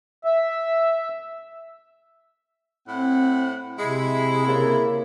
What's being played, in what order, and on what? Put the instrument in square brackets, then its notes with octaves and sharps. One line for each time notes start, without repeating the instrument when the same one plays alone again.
[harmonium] E5
[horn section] A2 E4 F#5 [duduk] C4
[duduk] C3 [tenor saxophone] G#3 [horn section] E4
[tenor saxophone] C#3 [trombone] A#3